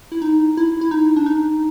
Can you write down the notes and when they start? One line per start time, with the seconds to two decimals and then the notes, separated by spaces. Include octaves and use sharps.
0.12 E4
0.22 D#4
0.57 E4
0.81 E4
0.91 D#4
1.16 D4
1.26 D#4